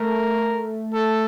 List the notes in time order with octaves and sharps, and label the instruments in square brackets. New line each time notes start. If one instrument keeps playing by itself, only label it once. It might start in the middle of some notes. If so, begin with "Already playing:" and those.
Already playing: [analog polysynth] A3 [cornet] A#4
[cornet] A4